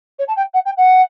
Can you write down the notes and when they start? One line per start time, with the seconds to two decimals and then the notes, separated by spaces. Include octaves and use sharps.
0.19 C#5
0.28 A5
0.36 G5
0.54 F#5
0.65 G5
0.77 F#5